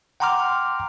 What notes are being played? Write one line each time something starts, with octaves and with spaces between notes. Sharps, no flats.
F#5 G5 A#5 C6 D6 F6